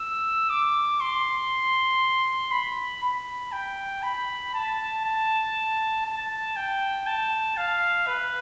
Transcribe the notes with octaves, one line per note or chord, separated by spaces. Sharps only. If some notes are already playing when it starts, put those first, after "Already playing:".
Already playing: E6
D6
C6
B5
B5
G5
B5
A5
A5
A5
G5
A5
F5
B4